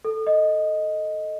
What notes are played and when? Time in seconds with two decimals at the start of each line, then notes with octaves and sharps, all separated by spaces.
0.05 A4
0.27 D#5